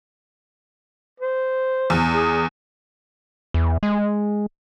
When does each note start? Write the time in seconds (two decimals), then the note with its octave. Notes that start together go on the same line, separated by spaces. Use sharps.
1.20 C5
1.90 E2
2.13 G#4
3.54 E2
3.83 G#3